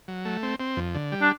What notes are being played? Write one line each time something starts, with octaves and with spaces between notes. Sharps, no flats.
F#3
A3
C4
C4
F2
D3
G3
D4